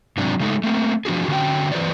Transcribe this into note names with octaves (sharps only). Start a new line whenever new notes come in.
G#2 C3 F#3 D4
C#3 G#3 A3 D#4
A3 A#3 C4
F3 D4 F#4 G#4
D3 C#4 F#4 G5
E3 F#3 B4 C5 D5